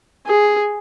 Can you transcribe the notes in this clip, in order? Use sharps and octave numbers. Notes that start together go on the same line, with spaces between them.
G#4